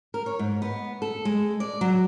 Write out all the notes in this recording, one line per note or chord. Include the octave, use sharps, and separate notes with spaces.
A#4
C#5
G#2
B3
A4
G#3
D5
F#3